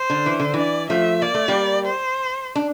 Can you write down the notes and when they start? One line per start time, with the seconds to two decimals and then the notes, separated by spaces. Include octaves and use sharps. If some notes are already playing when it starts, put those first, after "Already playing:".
Already playing: C5
0.10 D3
0.26 E3
0.40 D3
0.54 E3 D5
0.90 F3 A3 E5
1.21 A#3 D5
1.34 A3
1.48 G3 A#3
1.86 C5
2.55 D4